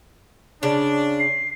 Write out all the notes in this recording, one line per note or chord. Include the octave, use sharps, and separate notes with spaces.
C#3 D4
C7